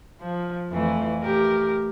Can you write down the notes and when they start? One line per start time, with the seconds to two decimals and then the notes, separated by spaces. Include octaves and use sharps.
0.20 F3
0.70 F2 E3 A3
1.22 A2 G4 A#4